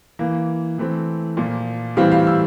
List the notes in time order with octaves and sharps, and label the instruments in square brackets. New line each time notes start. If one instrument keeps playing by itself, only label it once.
[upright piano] E3 A#3
E3 A3 C4
A#2 F3 A#3
A2 E3 G3 C4 F5
F5
E6